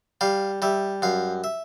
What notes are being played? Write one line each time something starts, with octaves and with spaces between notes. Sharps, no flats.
G3 F5
G3 E5
F#2 F5
E5